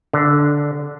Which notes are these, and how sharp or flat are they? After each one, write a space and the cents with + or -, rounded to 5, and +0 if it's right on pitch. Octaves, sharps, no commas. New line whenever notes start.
D3 -5